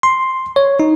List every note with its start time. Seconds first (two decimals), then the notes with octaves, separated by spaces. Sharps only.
0.03 C6
0.56 C#5
0.80 D#4